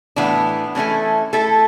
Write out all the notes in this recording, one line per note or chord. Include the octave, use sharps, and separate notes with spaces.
A2 E3 B3 D4
E3 A3 C#4 E4 A4
A3 E4 A4